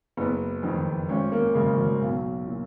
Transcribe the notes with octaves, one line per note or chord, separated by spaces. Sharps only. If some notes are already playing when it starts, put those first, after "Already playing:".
F#1 B3
F2 D#3
G#1 C#4
A#3
F#2 C#3 G#3
F#3
B1
A#2